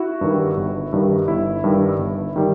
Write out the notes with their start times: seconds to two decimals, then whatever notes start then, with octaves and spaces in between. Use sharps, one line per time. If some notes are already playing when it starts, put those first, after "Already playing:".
Already playing: E4 F#4
0.21 G2 D#3 G3
0.57 G1
0.93 G2 D#3 G3
1.28 G1 E4
1.64 G2 D#3 G3
1.99 G1
2.36 D#3 G3